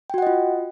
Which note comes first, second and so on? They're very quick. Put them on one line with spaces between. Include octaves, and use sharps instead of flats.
G5 F#4 F#5 D#5 F4